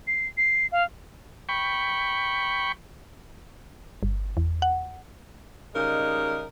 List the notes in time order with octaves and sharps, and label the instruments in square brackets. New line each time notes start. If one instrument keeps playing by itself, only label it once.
[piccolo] C7
C7
F5
[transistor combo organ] G5 B5 C#6
[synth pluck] G1
E2
F#5
[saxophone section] C#3 G3 G#3 D#4 A#4